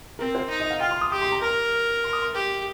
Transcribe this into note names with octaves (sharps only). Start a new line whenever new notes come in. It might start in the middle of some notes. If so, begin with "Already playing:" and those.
C4 A#4
C5
D#4
D#5
F5
F4 G5
C6
D#6
G4 D#6
C6
A#5
A#4 A#5
C6
D#6
C6
G4